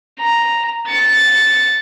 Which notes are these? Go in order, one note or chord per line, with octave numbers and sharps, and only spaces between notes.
A#5
A6 C#7